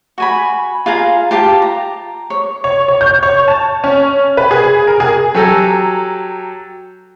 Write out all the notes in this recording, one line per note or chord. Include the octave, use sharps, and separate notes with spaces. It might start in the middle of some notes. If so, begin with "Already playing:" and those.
F#4 G#5 B5
F4 G#4 F5 A#5
F4 G4 A5
A#5
C#5
C#5
C#5
G6
C#5
A5
C#4
B4
G#4
A#4
G#4
F#3 G4 A4 G#5 A#5 E6